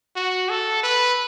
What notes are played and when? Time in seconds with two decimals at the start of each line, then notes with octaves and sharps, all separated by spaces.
0.16 F#4
0.49 A4
0.83 B4